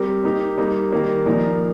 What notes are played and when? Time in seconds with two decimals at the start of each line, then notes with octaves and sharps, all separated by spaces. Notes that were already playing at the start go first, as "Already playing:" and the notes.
Already playing: G3 C4 G4 A#4
0.24 A#3 D#4 G4
0.58 G3 A#3 D#4
0.92 D#3 G3 A#3
1.26 A#2 F3 A#3 D#4 A#4